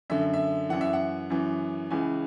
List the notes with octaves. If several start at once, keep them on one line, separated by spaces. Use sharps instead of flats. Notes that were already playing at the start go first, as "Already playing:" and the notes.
F#2 D3 E5
E5
F#2 E3 F#5
E5
F#5
F#2 E3
C#2 C#3 E3 G#5